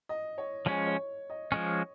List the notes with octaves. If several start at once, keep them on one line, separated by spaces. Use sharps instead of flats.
D#5
C#5
F3 G#3 C#4 C#5
C#5
D#5
F3 G#3 C#4